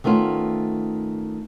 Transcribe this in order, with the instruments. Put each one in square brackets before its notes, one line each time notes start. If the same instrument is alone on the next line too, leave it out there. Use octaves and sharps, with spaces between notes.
[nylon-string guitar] D#3 A3 B3 C#4 F4